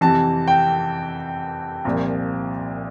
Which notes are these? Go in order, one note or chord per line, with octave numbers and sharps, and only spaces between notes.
F2 C3 E3 A5
G5
C2 A#2 F3